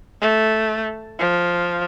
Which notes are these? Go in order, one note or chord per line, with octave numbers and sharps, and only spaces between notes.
A3
F3